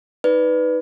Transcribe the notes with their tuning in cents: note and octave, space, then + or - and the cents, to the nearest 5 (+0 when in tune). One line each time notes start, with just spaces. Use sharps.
D#4 +20 B4 +5 D5 +0